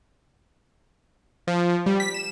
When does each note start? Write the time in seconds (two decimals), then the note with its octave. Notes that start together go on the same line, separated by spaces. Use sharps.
1.47 F3
1.86 G3
2.00 B6
2.14 E7